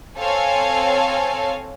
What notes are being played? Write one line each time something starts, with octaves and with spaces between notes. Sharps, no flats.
C4 A4 C#5 F5 G#5